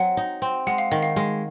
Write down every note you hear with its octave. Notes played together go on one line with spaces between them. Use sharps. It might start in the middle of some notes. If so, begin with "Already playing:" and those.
Already playing: F#3 C4 F#5
D#4
C4
G#3 F#5
F5
D#3 D#5
F5
G#3